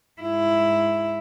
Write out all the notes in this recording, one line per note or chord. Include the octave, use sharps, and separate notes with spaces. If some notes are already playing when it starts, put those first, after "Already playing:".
G#2 E4